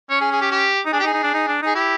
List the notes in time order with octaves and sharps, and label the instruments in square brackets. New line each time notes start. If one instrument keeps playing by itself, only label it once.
[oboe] C#4 [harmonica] C#5
[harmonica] G#4
G#4
G4
G4
[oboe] D#4
[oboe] D4 [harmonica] G#4
[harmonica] G4
[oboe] D#4
[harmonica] G#4
[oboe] D#4
D4
D#4
D4
[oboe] D#4 [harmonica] G#4
[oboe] E4 [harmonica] G4